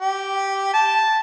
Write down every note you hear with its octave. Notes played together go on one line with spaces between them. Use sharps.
G4
A5